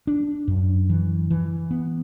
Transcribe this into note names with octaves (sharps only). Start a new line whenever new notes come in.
D4
F#2
E3
E3
B3